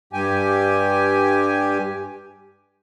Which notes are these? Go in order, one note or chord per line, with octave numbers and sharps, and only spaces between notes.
G2 G4 G#5